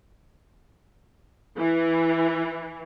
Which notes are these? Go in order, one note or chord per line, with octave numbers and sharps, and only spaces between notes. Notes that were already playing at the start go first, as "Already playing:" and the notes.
E3